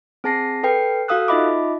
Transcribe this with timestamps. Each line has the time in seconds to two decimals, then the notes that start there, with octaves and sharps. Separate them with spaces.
0.24 C4 G#4 A5 A#6 C7
0.63 A4 B4 G5 C7
1.08 F#4 A4 F5 D#6 E6 F#6
1.28 D#4 F4 D#5 E5 B5 D6